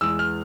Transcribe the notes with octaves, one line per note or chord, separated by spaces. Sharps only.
E2 E3 G#3 E6
F6